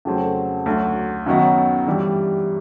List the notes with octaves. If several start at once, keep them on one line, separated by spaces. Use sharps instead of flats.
F2 C#3 F#3 A3 C4
D2 D3 F#3
F#2 D#3 F#3 B3 D#4
G2 E3 G3